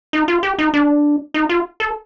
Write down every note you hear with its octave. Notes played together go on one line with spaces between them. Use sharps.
D#4
F4
G4
D#4
D4
D#4
F4
A4